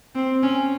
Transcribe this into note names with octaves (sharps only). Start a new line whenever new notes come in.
C4
C#4